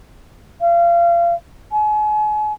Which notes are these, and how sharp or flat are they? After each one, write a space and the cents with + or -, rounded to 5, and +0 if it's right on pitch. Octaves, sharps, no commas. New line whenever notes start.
F5 -30
G#5 +40